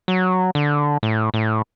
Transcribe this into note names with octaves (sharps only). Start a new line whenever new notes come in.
F#3
D3
A2
A2